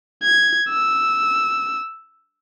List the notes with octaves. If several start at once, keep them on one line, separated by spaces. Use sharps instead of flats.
G#6
E6